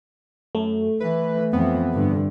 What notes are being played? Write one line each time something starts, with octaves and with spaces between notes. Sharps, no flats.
F#2 A3
E3 B4
F2 E3 B3
G2 D3